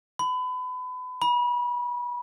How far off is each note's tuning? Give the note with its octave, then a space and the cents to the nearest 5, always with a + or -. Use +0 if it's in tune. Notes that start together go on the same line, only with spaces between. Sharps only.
B5 +30
B5 -30